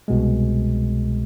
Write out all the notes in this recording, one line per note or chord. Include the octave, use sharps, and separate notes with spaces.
C2 B2 G#3